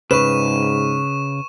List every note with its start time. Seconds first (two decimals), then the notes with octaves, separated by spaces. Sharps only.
0.11 G#2 C#3 B4 C#6 E7